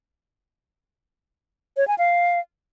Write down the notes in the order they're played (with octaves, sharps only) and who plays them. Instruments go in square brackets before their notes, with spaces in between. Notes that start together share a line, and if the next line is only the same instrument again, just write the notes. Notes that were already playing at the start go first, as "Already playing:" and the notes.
[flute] C#5
G#5
F5